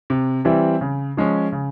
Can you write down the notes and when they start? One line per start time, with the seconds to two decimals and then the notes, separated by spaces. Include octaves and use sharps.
0.10 C3
0.45 E3 G3 C4 E4
0.81 C#3
1.17 F3 G#3 C#4
1.52 C#3